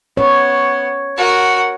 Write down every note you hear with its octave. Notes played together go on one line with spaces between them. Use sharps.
B3 C#5
F#4 A#4